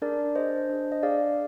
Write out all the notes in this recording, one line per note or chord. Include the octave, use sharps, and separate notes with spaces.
D4 G#4 A#4 D5
D4 G#4 C5 D#5
D4 G#4
D#5
D4 G#4 D5 F5